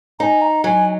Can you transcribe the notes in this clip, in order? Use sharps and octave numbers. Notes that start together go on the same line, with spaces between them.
D#4 G#5 A#5
A#5
F#3 G#5